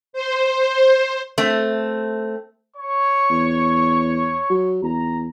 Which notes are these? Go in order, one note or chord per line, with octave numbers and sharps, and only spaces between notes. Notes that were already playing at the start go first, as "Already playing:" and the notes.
C5
A3 C4
C#5 C#6
E2
F#3
E2 A#5